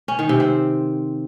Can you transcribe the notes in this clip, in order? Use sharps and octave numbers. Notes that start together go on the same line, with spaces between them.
C#4
D#3
C3
C4